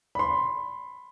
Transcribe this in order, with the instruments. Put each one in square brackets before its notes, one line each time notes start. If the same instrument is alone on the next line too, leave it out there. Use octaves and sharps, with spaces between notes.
[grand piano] B5 C6